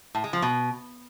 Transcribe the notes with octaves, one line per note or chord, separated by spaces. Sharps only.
A2
G#3
F3
B2